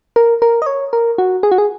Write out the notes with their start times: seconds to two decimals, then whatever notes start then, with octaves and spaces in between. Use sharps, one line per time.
0.16 A#4
0.42 A#4
0.62 D#5
0.66 C#5
0.93 A#4
1.18 F#4
1.43 G#4
1.52 F#4
1.58 G#4